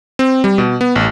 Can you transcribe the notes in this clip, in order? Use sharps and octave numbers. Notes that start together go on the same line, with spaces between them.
C4
G3
B2
B3
A1